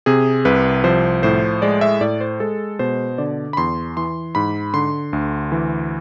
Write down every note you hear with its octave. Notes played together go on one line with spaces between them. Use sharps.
C3 G#4
C2 B4
F3 C5
A2 C5
G#3 D5
E5
A2 D5
C5
G#3 A4
B2 C5
D3 D5
B5
E2 C6
E3 C6
G#2 B5
D3 C6
D2
E3